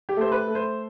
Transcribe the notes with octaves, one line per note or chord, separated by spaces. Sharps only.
G4
A3 C5
B4
A3
C5